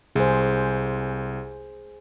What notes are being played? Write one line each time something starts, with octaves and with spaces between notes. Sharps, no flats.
C2 G#4 C5